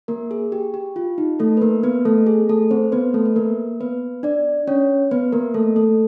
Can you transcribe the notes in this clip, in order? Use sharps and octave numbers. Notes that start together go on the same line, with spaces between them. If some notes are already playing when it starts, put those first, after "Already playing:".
A#3 A#4
G#4
G4
G4
F4
D#4
A3 A4
B4
A#3 A#4
B3 B4
A3 A4
G#4
A3 A4
C4 C5
B3 B4
A3 A4
B4
A#3 A#4
B3 B4
D4 D5
C#4 C#5
B3 B4
A#3 A#4
A3 A4
A3 A4